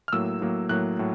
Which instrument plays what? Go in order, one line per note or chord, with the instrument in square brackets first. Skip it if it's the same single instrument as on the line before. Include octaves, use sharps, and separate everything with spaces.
[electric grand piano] F6
A2 F#3 A#3 E6
A2 F#3 A#3
A2 F#3 A#3 F#6
A2 F#3